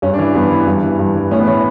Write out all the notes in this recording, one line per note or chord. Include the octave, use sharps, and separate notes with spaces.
G2 C#4
D4
E3
G2 B3
E3
G2
E3
G2
E3
A2 C#4
B3
E3 C#4